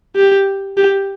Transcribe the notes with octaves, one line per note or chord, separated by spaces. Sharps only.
G4
G4